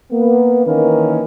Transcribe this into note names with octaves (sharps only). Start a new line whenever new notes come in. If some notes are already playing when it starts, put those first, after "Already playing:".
A#3 B3
D#3 E3 A#3 C#4 A#4 B4